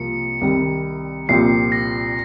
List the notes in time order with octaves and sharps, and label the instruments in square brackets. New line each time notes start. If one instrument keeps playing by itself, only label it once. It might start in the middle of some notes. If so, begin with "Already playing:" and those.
Already playing: [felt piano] C2 C3 F3 A#3 [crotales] C#7
[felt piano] C2 C3 D#3 G3
[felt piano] C2 A#2 F3 C4 G4 [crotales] C7
[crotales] A#6